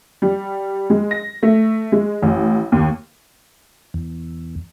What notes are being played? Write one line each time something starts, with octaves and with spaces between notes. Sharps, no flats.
G3
G#3
A#6
A3
G#3
A1
D#2
E2